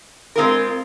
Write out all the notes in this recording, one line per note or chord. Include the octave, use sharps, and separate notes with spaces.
G#3 C4 F4 A#4